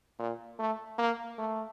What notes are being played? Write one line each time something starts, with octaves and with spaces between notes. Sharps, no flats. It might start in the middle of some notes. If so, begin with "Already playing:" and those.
A#2
A3
A#3
A3